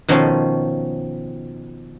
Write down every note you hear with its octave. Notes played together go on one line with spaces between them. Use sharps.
B2 D#3 F3 C#4 A5